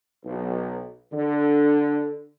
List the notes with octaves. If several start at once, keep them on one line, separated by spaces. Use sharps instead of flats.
B1
D3